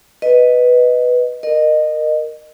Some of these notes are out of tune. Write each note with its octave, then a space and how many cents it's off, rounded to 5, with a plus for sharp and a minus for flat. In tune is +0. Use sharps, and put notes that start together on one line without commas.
B4 +0 D#5 +0
A#4 +0 D#5 -25